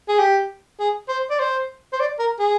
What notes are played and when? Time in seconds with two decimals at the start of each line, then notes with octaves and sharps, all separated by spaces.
0.08 G#4
0.19 G4
0.79 G#4
1.09 C5
1.30 D5
1.39 C5
1.93 C5
2.00 D5
2.19 A#4
2.39 G#4